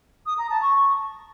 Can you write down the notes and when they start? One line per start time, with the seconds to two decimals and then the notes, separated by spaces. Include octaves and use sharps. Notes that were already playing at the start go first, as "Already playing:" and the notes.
0.26 D#6
0.38 A#5
0.50 A5
0.62 C#6